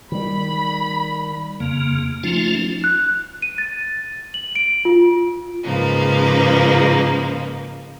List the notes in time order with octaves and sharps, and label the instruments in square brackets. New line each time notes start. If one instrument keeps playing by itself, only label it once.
[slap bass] D#3 G3 [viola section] B5
[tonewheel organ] F2 C#3 A#3
F3 A3 C#4 D#4 F4
[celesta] F#6
D#7
A6
F#7
D7
F4
[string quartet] G#2 C#3 F3 A#3 B4